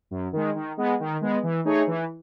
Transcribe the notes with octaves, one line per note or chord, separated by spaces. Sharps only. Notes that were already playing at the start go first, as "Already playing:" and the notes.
F#2
D#3 G#3
D#3
G#3 B3
D#3
G#3 B3
E3
A3 D#4 G#4 C#5
E3